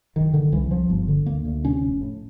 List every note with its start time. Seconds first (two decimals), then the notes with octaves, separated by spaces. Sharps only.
0.16 F#1 D#3
0.33 D3 D#3
0.52 C2 E3
0.71 C2 F3
0.90 G1
1.08 D3
1.26 D2 A#3
1.45 D2
1.64 C3 C#4
1.82 F1
2.01 A2